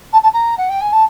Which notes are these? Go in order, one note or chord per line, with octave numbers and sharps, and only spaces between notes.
A5
A5
A#5
F#5
G5
G#5
A5